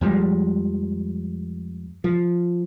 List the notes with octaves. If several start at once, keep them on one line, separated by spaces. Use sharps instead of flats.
F2 F3 G3 G#3
F3